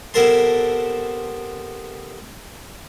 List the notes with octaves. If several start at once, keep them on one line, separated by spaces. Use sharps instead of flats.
C3 B3 A4 A#4 A5 C6